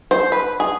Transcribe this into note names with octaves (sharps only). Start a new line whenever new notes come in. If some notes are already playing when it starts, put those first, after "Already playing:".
C5
B4
G#4